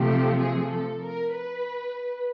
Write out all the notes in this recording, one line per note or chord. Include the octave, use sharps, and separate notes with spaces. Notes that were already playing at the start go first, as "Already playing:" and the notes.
Already playing: C3 F3 A3 G4
G#4
A4
A#4
B4